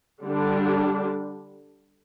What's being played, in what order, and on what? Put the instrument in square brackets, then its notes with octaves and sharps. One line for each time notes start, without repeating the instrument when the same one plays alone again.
[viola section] D3 G3 D4